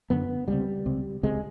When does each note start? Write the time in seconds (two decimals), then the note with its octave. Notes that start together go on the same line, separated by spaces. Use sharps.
0.10 F#2 D3 B3
0.48 C#2 C3 G3
0.86 C#2 C3
1.23 C#2 C3 G#3